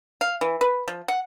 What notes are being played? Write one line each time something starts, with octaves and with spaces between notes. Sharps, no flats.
F5
E3
B4
F3
F#5